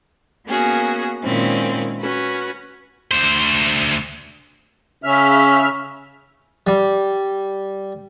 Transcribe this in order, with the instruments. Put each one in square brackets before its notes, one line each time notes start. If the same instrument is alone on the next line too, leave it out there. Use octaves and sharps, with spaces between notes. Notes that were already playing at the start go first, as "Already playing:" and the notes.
[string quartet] A#3 B3 C#4 F#4 G#4
A#2 D#3 G#3 C4 C#4 E4
C#4 F#4 B4
[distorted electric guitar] D2 C5
[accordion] C#3 E5 F6 [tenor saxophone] C#4
[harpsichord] G3